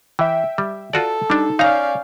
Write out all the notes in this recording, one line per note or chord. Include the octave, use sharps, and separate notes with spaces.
E3 E5 G5
G3
F4 F#4 A4 D5
G3 D4 D#4
C#4 D#4 D5 F5 A#5 F6 G6